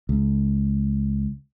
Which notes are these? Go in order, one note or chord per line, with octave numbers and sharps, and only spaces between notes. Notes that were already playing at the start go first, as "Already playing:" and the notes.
C#2